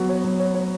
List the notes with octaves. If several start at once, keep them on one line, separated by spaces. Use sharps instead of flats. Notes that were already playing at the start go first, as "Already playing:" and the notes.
Already playing: F#3 B3 F#4
C#5
F#3
C#5
C#5